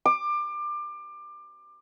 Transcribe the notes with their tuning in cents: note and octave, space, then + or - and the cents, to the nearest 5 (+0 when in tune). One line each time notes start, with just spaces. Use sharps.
D6 +25